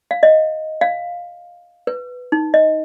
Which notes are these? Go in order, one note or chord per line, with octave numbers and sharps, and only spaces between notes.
F5
D#5
F5
B4
D#4
D#5